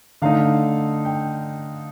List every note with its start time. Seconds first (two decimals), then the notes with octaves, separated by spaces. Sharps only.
0.22 D3 A3 D#4 F5
1.05 G5